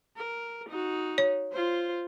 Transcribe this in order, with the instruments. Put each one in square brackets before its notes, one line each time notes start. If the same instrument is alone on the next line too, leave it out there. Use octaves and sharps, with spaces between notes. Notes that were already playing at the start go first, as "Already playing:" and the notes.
[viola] A#4
D#4 F#4
[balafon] C#5
[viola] F4 C5